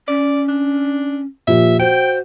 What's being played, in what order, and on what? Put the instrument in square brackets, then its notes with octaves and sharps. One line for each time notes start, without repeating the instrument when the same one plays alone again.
[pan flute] C#4 [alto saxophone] D5
[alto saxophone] D4
[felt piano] A#2 F3 G4 [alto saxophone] E5
[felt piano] F#4 [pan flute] C5 [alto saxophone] G5